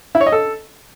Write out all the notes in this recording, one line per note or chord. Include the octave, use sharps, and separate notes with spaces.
E4
C#5
D#5
A4